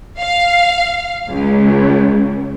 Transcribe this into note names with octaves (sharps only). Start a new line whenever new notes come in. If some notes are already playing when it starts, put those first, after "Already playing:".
F5
C#2